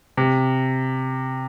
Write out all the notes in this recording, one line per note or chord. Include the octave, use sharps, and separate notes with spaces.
C3